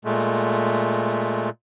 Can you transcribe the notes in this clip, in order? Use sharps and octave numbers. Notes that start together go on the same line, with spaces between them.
A#2 G#3 A3